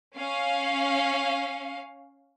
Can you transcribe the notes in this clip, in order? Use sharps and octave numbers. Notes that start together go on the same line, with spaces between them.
C#4 F5